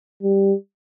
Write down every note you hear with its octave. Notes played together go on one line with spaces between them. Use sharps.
G3